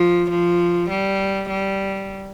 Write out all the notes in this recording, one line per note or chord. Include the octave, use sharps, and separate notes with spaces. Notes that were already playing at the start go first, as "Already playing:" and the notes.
Already playing: F3
F3
G3
G3